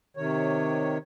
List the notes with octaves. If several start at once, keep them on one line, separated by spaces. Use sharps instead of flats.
C3 D#3 C#5